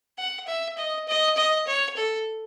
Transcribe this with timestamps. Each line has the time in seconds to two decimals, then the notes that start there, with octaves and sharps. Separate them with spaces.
0.18 F#5
0.47 E5
0.77 D#5
1.08 D#5
1.37 D#5
1.67 C#5
1.96 A4